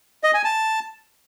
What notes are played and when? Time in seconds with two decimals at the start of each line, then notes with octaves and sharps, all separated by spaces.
0.24 D#5
0.34 G#5
0.44 A5